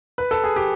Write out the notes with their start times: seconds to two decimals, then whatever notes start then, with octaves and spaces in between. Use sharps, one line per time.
0.18 B4
0.31 A4
0.44 G#4
0.56 G4